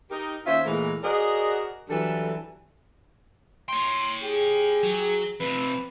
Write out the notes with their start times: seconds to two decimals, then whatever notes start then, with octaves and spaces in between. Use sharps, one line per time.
0.11 D#4 G4 A#4
0.46 D#2 C#4 F4 C5 E5
0.66 A#2 E3 G#3 A3 A#4
1.03 F#4 G#4 A#4 C5 D5 D#5
1.89 E3 F#3 G3 D4 A4
3.69 C#5 G5 C6
4.23 G4 G#4
4.83 F#3
5.40 F2 C3 B4